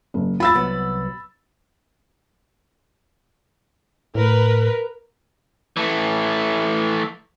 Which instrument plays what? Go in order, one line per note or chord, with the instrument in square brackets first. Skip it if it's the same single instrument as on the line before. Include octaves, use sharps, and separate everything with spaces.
[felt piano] F#1
[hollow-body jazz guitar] E2 F4 [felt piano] B5 E6 A6
[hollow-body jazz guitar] C2 F#3 B3
[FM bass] A2 [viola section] A#4 B4
[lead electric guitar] E3 A3